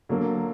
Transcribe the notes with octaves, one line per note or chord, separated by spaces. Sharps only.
D3 F#3 A#3